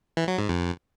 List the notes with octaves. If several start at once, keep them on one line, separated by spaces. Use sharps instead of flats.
E3
F#3
G#2
F2